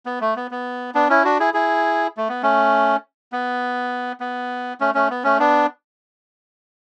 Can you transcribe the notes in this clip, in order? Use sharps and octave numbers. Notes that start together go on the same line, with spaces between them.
B3
A3
B3
B3
B3 D4
C#4 E4
D4 F#4
E4 G#4
E4 G#4
A3
B3
A3 C#4
B3
B3
A3 C#4
A3 C#4
B3
A3 C#4
B3 D4